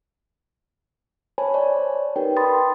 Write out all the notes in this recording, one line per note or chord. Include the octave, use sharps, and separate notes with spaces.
C5 C#5 G#5 A5 B5
C#5 D5
D#4 G4 A#4 B4 G5
B5 C6 D#6 A6